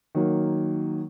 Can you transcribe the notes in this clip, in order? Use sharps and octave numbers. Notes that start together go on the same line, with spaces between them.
D#3 F#3 A#3